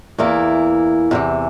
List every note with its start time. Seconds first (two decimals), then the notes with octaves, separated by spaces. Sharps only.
0.18 E2 E3 A#3 E4
1.11 E2 C3 E3